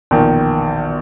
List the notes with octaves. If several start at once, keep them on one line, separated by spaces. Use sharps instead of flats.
A#1 E2 B2 D#3